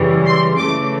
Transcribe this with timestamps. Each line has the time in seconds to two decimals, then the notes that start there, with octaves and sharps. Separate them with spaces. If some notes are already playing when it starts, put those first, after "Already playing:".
Already playing: F#2 C#3 E3 G3
0.26 C6
0.57 C#3 E3 A3 D6